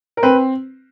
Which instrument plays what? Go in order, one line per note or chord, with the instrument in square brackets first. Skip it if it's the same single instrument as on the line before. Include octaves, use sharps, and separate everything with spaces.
[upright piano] A#4
[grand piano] C4 [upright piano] B4